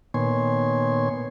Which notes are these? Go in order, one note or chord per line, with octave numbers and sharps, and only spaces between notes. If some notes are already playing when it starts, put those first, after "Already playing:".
A#2 D#3 B3 C#5 G#5 C6